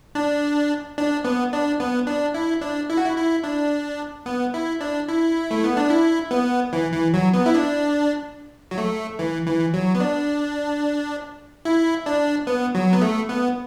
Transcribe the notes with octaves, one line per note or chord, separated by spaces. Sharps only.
D4
D4
B3
D4
B3
D4
E4
D4
E4
F#4
E4
E4
D4
B3
E4
D4
E4
A3
B3
D4
E4
B3
E3
E3
F#3
B3
E4
D4
F#3
A3
E3
E3
F#3
B3
D4
E4
D4
B3
F#3
B3
A3
B3